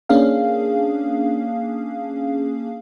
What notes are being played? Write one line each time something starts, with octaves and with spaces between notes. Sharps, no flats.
A#3 C#4 D4 G#4 F5